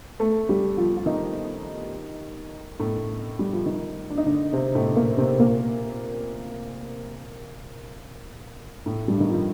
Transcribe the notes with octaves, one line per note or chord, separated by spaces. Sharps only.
A3 A4
G3 G4
F3 F4
F4
D#3 D#4
A2 A3
G3
F3
D#3
D4
D#4
D3 D4
C3 C4
A2 A3
A#2 A#3
C3 C4
A#2 A#3
A2 A3
G2 G3
D#3
F3